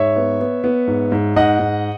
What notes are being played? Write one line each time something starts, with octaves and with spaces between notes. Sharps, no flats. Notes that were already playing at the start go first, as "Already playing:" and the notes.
Already playing: G#2 C#5 E5
B3
B3
B3
G#2
G#2
G#2 D#5 F#5
G#2